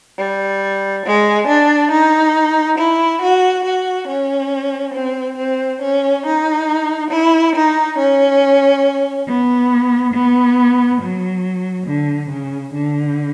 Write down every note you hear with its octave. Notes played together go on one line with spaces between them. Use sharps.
G3
G#3
D4
D#4
E4
F#4
F#4
C#4
C4
C4
C#4
D#4
E4
D#4
C#4
B3
B3
F#3
D3
C#3
D3